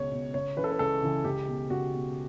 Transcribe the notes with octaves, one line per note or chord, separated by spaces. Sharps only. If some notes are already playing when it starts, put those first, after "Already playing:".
Already playing: C#2 B2 C#5
B2
C#2 C#5
C#3 E3 B4
A4
B4
C#2 A4
C#3 E3
C#2 G4
B2
C#2 F#4
B2